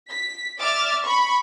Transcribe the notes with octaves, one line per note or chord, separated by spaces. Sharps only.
B6
D5 E5 D6 F6 A6
B5 C#6